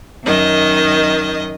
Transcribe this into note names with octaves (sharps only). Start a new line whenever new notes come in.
F#2 D#3 D#5